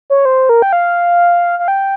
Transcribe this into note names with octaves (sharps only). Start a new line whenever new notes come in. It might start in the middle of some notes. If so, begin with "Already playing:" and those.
C#5
C5
A#4
G5
F5
F5
G5